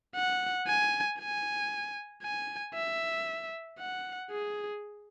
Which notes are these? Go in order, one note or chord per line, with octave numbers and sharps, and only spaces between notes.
F#5
G#5
G#5
G#5
E5
F#5
G#4